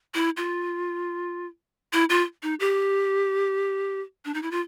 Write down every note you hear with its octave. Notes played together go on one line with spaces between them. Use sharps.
E4
F4
E4
F4
D#4
G4
D4
D#4
E4
F4